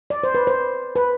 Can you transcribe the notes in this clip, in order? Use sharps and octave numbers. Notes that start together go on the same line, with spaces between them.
D5
C5
B4
C5
B4